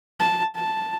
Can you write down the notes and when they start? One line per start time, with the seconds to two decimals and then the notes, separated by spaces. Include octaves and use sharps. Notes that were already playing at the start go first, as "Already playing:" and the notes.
0.20 A5
0.56 A5